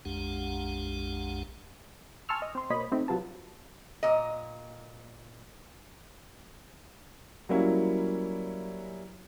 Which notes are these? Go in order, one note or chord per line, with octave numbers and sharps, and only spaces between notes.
A#1 F2 G#3 D4 G4 F#5
G#5 A5 C6 C#6 E6 F6
D#5
C4 C6
B2 A#3 C5 C#5 D#5 B5
A3 C4 D#4
C3 F#3 F4 B4 A5
A#2 D#5
F#3 G3 A#3 C#4 E4